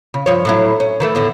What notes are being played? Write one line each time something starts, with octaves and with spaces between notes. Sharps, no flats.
C#3
G2 F3 C#5
A2 F#3 E4
C#4
D#3 E3 A3
E2 A2 D3